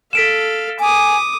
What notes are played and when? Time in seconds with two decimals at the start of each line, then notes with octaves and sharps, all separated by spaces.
0.13 A4 F5 B6 D7 E7
0.80 G#5 D6 D#6